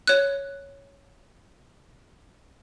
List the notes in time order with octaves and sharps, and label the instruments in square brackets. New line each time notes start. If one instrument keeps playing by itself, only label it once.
[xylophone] C#5 F#6